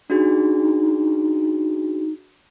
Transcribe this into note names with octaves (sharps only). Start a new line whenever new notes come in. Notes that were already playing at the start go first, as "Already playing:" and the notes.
D4 D#4 F#4 G#4